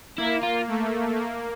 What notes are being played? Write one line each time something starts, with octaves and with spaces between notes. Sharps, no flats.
A#3 E4
F4
A3
A#3